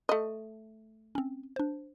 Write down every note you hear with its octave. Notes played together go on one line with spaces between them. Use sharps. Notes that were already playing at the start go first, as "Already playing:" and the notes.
A3 D#5
C4 C#4
D4 C5